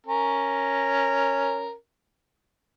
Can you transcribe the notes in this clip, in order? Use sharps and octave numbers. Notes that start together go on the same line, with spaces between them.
C#4 A#4